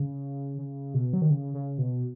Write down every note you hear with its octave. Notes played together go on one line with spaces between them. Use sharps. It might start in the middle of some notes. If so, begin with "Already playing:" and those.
Already playing: C#3
C#3
B2
F#3
D#3
C#3
C#3
B2